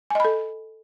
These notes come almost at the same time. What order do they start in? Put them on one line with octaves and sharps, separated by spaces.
G#5 D#5 B5 A4